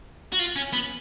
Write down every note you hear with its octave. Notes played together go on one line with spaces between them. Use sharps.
F#4
F4
C#4
B3